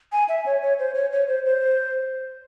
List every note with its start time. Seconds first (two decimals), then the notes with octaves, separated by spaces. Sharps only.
0.12 G#5
0.29 E5
0.46 C#5
0.62 C#5
0.79 C5
0.95 C#5
1.12 C#5
1.28 C5
1.46 C5